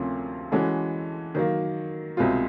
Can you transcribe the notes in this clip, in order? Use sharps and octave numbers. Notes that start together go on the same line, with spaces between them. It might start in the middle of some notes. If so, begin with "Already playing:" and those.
Already playing: D2 C3 F3 A#3 C#4
E3 G#3 C#4 F#4 A4
D#3 F#3 A#3
C2 B2 G#3 C4 F4